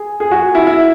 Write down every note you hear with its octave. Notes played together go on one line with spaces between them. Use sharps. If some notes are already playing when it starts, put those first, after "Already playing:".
Already playing: G#4
G#4
F#4
E4
E4